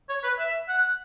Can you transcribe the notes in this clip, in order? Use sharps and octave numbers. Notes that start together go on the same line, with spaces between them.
C#5
B4
E5
F#5